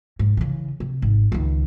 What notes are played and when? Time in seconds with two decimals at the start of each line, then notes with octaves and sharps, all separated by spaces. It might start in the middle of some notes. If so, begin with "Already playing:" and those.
0.19 G#2
0.37 C#3 E3
0.80 C3
1.02 G#1
1.32 C#2 D#3